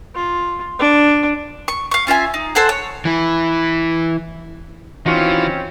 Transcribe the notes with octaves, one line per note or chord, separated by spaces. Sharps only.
F4
D4
C#6
F5 C#6
C#4 F4 E5 G#5
D#4
A4 C5 F#5 G#5
C#5
E3 E4
E3 C4 C#4 D#4 F4 F#4